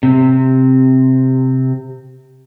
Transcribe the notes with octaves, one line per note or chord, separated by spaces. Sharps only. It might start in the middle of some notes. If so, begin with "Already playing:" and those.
C3 C4